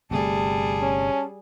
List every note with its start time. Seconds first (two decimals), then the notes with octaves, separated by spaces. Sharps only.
0.11 G1 C3 G3 A3 G#4 A5
0.82 C#4